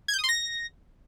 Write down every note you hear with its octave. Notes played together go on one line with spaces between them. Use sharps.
G#6
G6
D#6
C6
A#6